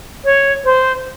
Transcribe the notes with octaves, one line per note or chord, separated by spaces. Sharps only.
C#5
C5